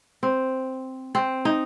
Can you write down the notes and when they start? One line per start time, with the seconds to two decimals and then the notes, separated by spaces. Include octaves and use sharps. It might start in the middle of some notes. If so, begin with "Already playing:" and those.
0.23 C4
1.15 C4
1.45 D#4